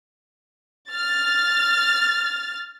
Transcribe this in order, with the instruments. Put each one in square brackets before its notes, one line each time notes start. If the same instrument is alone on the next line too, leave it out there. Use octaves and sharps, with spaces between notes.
[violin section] F6 A6